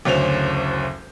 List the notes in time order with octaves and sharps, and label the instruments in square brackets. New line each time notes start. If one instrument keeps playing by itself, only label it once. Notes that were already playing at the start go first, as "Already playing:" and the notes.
[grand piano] F#1 D2 C#4 C5 F7